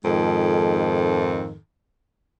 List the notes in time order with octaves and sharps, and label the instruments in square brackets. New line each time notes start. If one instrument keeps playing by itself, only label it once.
[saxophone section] F2 G#2 D#3 G#3 A4